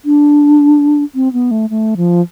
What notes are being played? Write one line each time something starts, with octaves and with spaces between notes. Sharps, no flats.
D4
C4
B3
A3
A3
F3